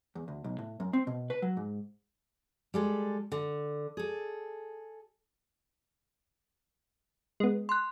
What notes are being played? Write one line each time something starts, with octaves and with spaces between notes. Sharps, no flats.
E2
D2
B1
A2
F#2
C4
B2
B4
F#3
G#2
G3 G#3 A4
D3
G#4 A4
G#3 B3
C6 F#6